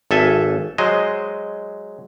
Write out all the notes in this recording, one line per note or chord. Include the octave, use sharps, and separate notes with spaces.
G#1 A4 E5 G#5
F#3 G#3 C5 D#5